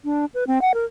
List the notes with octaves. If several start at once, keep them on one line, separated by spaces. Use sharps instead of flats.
D4
B4
C4
F#5
A#4